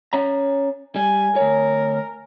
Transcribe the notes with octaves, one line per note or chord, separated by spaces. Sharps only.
C#4 C#5 A#5
G3 G#5
D2 A#4 C#5